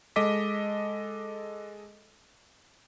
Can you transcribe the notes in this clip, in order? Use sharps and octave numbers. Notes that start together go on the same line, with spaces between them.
G#3 A4 D#5 D6 B6